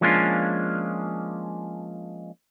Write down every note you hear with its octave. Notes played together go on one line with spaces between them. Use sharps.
F3 G#3 A#3 C#4 D4 F4